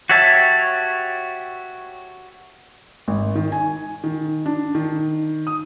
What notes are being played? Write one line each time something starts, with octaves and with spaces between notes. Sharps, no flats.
F#4 G4 C#5 E5 A5
G#1
D#3
G#5
D#3
D4
D#3
D#6